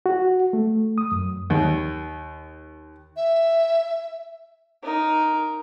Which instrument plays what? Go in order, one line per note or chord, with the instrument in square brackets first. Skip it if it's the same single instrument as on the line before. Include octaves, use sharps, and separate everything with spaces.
[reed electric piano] F#4
A3
D#6
F#2
[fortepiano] D#2
[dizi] E5
[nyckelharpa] D#4 A#4